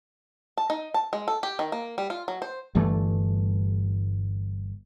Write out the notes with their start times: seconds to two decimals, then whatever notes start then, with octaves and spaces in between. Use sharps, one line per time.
0.57 A5
0.70 D#4
0.94 A5
1.13 G#3
1.28 A4
1.43 G4
1.59 D#3
1.72 A#3
1.98 G3
2.10 F4
2.28 F#3
2.42 C5
2.75 G1 G2 E3 A3